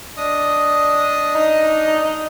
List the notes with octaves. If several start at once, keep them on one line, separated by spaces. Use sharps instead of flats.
D4 D#5 D#6
D#4